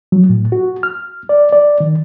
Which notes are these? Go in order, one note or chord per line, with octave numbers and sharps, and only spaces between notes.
F#3
A2
F#4
F6
D5
D5
D#3